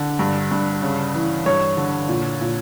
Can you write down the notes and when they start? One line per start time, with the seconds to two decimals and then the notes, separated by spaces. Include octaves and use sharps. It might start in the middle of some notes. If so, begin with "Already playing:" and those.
Already playing: D3
0.19 G2
0.52 G2
0.82 C#3
1.15 E3
1.46 G2 C#5
1.77 D3
2.09 A#2
2.41 A#2